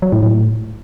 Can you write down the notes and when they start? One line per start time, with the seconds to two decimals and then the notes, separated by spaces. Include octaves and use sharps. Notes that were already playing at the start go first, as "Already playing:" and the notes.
0.02 F#3
0.12 A2
0.23 A2